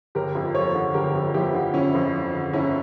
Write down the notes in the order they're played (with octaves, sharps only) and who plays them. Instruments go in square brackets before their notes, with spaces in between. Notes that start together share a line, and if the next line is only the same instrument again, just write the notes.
[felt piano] G1 [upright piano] G4 A#4
[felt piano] F2
[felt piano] F3 [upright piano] A4 C#5
[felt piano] D3
[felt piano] G1 [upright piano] G4 A#4
[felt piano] F2
[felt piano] F3 [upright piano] E4 G4
[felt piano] D3
[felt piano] G1 [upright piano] C#4 E4
[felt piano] F2
F3
D3
[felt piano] G1 [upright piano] C#4 E4